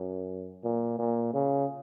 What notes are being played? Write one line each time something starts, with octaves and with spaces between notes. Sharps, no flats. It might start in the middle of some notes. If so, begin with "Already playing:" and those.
Already playing: F#2
A#2
A#2
C#3